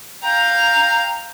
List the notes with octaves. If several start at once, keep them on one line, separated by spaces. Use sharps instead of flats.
F5 G5 A#5